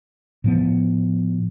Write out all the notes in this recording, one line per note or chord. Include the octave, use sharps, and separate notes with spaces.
A2 F3 B3